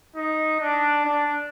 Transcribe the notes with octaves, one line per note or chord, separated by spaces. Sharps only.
D#4
D4
D4